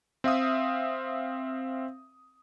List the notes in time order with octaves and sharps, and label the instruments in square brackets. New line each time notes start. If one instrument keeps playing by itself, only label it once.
[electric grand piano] C4 E5 F5 D#6